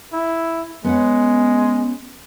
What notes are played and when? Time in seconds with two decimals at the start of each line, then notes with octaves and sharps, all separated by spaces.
0.13 E4
0.84 G#3 B3 C#4 F#5